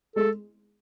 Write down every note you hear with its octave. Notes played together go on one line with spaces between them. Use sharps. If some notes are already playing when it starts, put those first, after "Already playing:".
G#3 A4